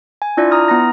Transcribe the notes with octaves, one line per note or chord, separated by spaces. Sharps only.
G#5
D4 E4 F4 D5
A#5 D#6 F6
B3 E4 A#5 A#6